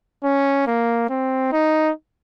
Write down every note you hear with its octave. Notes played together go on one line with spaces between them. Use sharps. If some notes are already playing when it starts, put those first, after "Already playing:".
C#4
A#3
C4
D#4